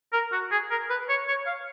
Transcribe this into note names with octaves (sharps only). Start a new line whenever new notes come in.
A#4
F#4
G#4
A#4
B4
C#5
C#5
F5